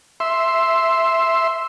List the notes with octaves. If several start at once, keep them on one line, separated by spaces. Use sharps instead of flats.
E5 C6